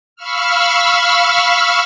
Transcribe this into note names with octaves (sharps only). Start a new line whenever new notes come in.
F5 B5 C#6 E6 F6